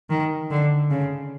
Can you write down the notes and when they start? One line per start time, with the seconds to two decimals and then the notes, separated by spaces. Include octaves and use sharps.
0.10 D#3
0.51 D3
0.90 C#3